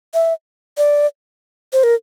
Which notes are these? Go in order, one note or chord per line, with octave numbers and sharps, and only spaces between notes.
E5
D5
C5
A#4